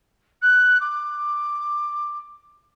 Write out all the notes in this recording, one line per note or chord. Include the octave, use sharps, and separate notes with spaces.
F#6
D6